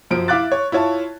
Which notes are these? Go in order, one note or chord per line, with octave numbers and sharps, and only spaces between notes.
F#2 F3 D7
E4 E5 F5 D6 F#6 A6
C#5
E4 F4 C#5 A5